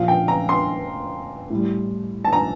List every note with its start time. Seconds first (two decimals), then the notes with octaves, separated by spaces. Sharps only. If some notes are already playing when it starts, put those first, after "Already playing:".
Already playing: A#2 F3 F5
0.08 G5
0.28 A#5
0.49 C6
1.50 A2 G3
2.25 A5
2.33 A#5